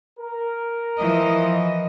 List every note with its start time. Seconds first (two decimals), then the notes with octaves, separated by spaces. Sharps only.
0.19 A#4
0.97 E3 F3 D#5